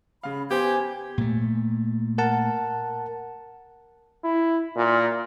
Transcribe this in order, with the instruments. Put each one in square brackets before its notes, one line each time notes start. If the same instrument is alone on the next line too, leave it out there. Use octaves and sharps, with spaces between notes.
[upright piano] C#3 F5 [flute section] B5
[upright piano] B3 C5 [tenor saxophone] G4 [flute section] G#5 G#6
[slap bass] A#2 A3
[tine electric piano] A#4 F#5 A5
[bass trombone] E4
A#2